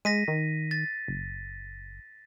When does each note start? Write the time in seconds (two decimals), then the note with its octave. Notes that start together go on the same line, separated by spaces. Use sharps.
0.05 G#3 A#6 B6 D#7
0.28 D#3
0.71 A6
1.08 F#1